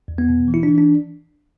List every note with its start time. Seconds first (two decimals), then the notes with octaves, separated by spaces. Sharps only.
0.08 E2
0.18 B3
0.28 B2
0.48 E3
0.54 E4
0.63 E3 D4
0.78 D4